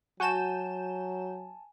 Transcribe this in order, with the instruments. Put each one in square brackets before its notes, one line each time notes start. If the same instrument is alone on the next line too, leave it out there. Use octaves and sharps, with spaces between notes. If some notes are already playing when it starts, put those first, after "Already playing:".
[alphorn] F#3 [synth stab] F#4 G6 E7 [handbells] G#5 A5